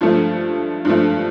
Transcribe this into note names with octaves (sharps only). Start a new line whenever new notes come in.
G2 F3 A3
G2 F3 A3